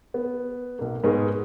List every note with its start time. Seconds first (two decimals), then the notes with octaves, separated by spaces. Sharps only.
0.14 B3
0.79 B1 A#3
1.04 G#2 B3 G#4 A#4 C#6